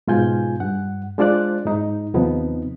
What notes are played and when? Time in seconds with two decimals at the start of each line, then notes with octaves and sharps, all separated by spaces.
0.08 G#2 B2 F4 G#5 G6
0.60 G2 F#5
1.18 G#3 D4 F4 C5 D5 F#6
1.65 G#2 D#4
2.14 D#2 C3 F3 B3 D#4